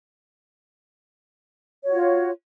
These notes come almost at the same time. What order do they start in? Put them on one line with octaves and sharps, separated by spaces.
C#5 F#4 F4